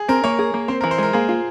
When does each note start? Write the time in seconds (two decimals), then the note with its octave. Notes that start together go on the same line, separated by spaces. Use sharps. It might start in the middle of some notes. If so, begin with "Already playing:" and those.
Already playing: G#4
0.08 C4 A#4
0.24 A#3 C#5
0.39 G#4
0.54 A#3
0.68 C4 C5
0.81 A#4
0.84 E3
0.91 C5
0.98 G#3 A#4
1.13 A#3 G#4
1.29 F4